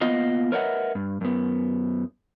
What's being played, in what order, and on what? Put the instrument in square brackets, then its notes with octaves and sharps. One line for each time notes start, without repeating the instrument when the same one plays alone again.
[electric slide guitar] A#3 B3 F4 D#5 F5
A#4 B4 C#5 D#5 E5 F#5
G2
F#2 B3